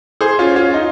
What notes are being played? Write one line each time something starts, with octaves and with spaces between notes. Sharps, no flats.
G#4 C5
C#4 F4
C#4 F4
D#4